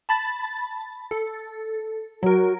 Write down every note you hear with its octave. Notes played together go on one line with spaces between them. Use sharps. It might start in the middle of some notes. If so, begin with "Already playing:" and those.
A5 B5 A6
A4
F#3 F#4 A#4